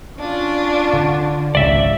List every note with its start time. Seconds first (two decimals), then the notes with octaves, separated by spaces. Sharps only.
0.19 C#4 D4 F4
0.93 D3
1.55 G#1 C#2 C#3 D5 E5